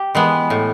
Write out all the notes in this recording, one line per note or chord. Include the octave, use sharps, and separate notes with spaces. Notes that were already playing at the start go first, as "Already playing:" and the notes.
Already playing: G4
E3 G#3 B3
A2